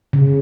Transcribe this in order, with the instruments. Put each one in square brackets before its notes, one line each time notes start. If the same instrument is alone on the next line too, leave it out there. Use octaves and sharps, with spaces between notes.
[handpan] C#3